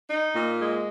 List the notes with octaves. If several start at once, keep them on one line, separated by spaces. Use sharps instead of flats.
D#4
A#2
G#3